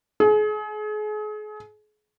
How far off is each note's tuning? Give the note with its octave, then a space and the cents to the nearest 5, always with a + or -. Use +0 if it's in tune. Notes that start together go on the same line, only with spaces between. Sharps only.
G#4 +35